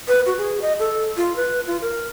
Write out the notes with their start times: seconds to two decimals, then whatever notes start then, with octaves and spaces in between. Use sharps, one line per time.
0.08 B4
0.26 F#4
0.38 G#4
0.62 D#5
0.79 A4
1.17 F4
1.36 B4
1.67 F4
1.82 A#4